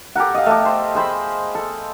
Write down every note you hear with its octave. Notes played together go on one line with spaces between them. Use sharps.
G4 A4 A#4 F#5
D#5 F5
A3 G4
C5
G#4 C5 B5
A4